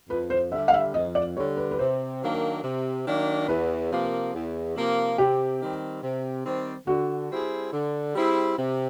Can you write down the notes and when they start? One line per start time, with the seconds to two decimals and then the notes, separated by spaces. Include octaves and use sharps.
0.09 F2 B4
0.30 C5
0.51 D3 E5
0.55 G3
0.68 F5
0.73 E5
0.94 F2 D#5
1.15 D5
1.36 D3 G3 C#5
1.57 B4
1.71 B4
1.79 C3 C5
2.22 D#3 F#3 A#3 D4
2.63 C3
3.06 D#3 F#3 A#3 D4
3.48 E2 B4
3.91 C3 F3 A#3
4.33 E2
4.76 C3 F3 A#3
5.18 C3 G4
5.60 D#3 G3 C4
6.02 C3
6.45 D#3 G3 C4
6.87 D3 F#4
7.30 G3 C4 E4 G#4
7.72 D3
8.14 G3 C4 E4 G#4
8.57 C3